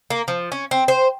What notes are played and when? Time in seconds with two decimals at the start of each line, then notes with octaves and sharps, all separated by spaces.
0.10 A#3
0.28 F3
0.52 C#4
0.71 C4
0.88 C5